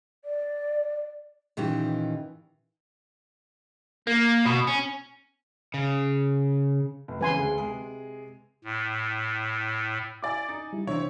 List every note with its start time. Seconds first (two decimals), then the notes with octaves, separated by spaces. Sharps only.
0.25 D5
1.57 A#2 D#3 E3 C#4 G4
4.07 A#3
4.45 B2
4.67 C#4
5.74 C#3
7.08 F1
7.21 E2 C#3 B4 G#5 C6
7.39 D2 G#3
7.58 C3 G#3 G#4
8.64 A2
10.22 E4 D5 G#5 D6
10.49 D#4
10.73 G3 E4
10.87 C3 E3 C4 D4 E4 C#5